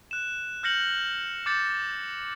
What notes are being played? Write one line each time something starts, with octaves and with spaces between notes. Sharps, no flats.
F#6 E7
F6 G6 A#6 C#7 F#7
D6 G6 A6 C#7